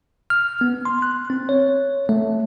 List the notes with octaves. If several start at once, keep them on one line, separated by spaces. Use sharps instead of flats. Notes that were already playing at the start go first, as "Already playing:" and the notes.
F6
B3
C6
F#6
C4
C#5
A3